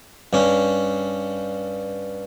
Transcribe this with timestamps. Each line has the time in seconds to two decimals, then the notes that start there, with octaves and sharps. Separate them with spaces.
0.33 G2 C#4